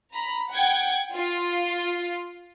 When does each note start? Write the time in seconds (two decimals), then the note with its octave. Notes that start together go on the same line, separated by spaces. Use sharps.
0.12 A#5 B5
0.50 F#5 G5 G#6
1.15 F4